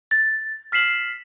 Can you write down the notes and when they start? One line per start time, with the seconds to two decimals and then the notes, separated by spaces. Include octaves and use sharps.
0.11 A6
0.72 F6 B6 C7 E7 F#7